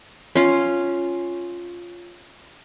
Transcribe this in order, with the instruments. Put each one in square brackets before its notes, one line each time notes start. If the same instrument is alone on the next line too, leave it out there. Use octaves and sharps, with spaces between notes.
[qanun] C#4 F4